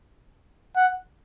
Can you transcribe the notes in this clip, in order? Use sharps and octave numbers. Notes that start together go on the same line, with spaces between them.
F#5